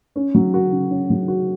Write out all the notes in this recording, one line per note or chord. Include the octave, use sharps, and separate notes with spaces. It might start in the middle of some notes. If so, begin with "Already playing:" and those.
C#4
F#3
F#4
C#3
C#4
F#3
F#4